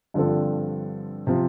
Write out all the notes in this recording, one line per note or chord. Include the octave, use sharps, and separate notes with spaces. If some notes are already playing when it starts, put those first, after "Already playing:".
G2 D3 F3 C4 A4
C3 F3